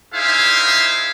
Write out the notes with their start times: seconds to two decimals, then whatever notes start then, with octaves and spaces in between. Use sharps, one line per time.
0.14 D#4 E4 G#4 C5 E5 F5